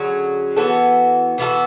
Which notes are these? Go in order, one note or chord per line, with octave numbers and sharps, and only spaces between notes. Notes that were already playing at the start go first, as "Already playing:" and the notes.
Already playing: D3 F#3 C#4 G#4
E3 B3 F#4 A4
E3 B3 F#4 A4